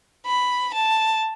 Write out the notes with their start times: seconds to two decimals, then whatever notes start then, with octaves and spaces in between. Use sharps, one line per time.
0.27 B5
0.74 A5